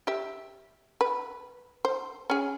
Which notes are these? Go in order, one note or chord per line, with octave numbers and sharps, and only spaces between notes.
G4 E5
B4
C5
C#4 G#4